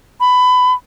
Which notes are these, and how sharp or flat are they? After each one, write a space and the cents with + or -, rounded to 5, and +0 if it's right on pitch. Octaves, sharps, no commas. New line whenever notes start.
B5 +20